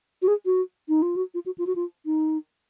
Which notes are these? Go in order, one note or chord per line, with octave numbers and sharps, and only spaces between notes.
F#4
G#4
F#4
D#4
F4
F#4
F4
F#4
F4
F#4
F4
D#4